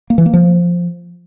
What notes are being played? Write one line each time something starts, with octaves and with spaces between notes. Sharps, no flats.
A#3
E3
A#3
F3